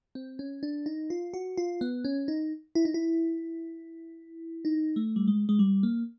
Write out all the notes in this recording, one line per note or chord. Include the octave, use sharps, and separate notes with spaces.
C4
C#4
D4
D#4
F4
F#4
F4
B3
C#4
D#4
E4
D#4
E4
D#4
A3
G3
G#3
G#3
G3
A#3